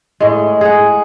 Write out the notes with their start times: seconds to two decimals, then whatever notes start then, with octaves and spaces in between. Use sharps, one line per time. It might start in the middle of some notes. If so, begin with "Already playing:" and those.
0.20 A2 G#3
0.61 G#4 F#5